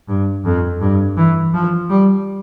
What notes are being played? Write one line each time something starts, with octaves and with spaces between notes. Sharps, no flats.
G2
F2
G2
E3
F3
G3